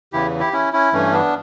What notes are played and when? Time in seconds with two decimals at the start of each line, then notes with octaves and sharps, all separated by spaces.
0.13 E2 C#3 E3 E4 G4
0.40 E4 G4
0.53 C#4 E4
0.73 C#4 E4
0.93 G2 E3 A3 C#4
1.13 B3 D4